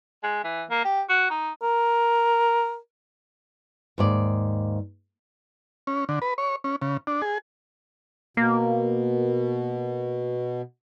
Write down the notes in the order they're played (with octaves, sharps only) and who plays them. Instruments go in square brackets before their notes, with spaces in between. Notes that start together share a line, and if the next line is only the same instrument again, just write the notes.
[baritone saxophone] G#3
E3
A#3
G4
F#4
D#4
[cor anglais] A#4
[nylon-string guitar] D#2 G#2 D5
[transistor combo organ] C#4
D3
B4
C#5
C#4
C#3
D4
G#4
[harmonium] B2 [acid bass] A#3